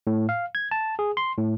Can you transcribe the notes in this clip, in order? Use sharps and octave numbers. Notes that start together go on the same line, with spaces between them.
A2
F5
G#6
A5
G#4
C6
A2